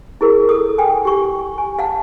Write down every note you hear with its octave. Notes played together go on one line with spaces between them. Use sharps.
E4 G#4 A#4
A4 D#6
G5 G#5
G4 C#6
G#5
F5 F#5 A5